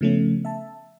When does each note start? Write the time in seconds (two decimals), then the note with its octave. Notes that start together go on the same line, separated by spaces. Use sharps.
0.01 C#3 F3 A3 B3 C#4
0.45 E5 A5